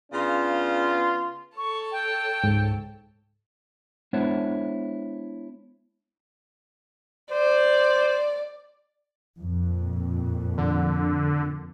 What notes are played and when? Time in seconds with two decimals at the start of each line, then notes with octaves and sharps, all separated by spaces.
0.13 C#3 B3 D4 F4
1.57 A4 C#5 A5 C#6
1.92 G5
2.43 C#2 G#2
4.13 G#3 B3 D4 E4 C5 C#5
7.31 C5 D5
9.38 F2 A#2
10.57 D3